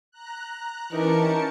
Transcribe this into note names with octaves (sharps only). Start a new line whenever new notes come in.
A#5 F#6
E3 C#4 D#4 G4 A#4 A5 C#7